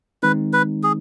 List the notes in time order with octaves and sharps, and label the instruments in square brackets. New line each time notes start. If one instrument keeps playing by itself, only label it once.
[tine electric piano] D#3 G#3 C4 D#4 [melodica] B4
[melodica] B4
G#4